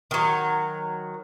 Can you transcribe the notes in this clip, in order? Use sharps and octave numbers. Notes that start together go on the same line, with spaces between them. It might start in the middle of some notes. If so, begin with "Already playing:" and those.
D#3 F#3